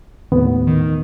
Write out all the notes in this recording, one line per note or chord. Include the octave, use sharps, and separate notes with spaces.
D#2 A2 B3
D#3